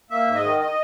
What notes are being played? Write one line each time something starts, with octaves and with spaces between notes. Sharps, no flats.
A#3 E5
G#2
D#5
D#3
D#5